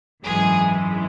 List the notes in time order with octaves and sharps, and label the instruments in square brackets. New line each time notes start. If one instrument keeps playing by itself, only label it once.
[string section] G#1 F#2 E3 G#3 G#4